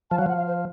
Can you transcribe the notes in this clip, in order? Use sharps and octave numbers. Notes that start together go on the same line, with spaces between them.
F3 A5
F#3 F5
F3 F#5
F5
C5